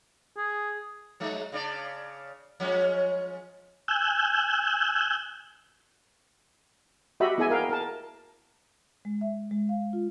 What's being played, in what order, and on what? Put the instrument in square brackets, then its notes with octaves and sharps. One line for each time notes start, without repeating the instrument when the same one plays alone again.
[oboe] G#4
[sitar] F#3 G#3 D#4
C#3 D4 D5
F3 G#3 C#4
[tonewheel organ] G#5 E6 F#6 G6
[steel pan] F#4 G4 D#5 E5 B5
B3 E4 G#4 D#5 E5 G#5
A#4 F5 G5
A#4 A5
[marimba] G#3
E5
G#3
F5
F4